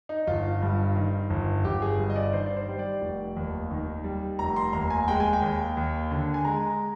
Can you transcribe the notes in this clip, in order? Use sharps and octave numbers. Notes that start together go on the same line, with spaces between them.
D#4
G1 F4
G2
D#3
G1
G1 G4
G#4
G2
D#5
D5
D#3 C5
D5
C5
G3
D5
F1
D#2
D#3
G3
F1 A#5
C6
D#2 A#5
G#5
G#3 G5
G#5
G5
D#2
D#2
D3
G#5
G#3 A#5